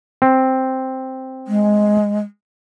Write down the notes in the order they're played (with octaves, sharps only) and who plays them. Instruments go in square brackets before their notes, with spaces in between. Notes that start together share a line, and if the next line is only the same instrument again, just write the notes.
[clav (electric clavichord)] C4
[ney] G#3